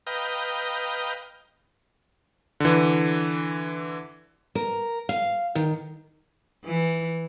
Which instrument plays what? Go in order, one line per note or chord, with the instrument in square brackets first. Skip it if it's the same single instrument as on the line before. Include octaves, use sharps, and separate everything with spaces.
[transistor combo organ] B4 D#5 F5 G5 A#5
[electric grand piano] D3 E3
[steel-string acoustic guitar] A#4
F5
D#3
[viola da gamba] E3